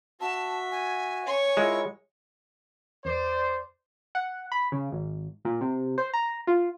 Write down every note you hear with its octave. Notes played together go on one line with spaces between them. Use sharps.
F#4 E5 A5
G#5
C#5 C#6
G#3 E4 F4 A#4
E2 C5 D5
F#5
B5
C#3
G#1
A#2
C3
C5
A#5
F4